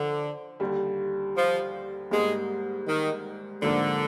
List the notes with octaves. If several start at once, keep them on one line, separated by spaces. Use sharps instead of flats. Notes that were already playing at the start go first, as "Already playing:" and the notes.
Already playing: D3 F3
D#2 D3 G3
F3
G#2 G3 G#3 A#3
D#3
G#2 D3 F3 A#3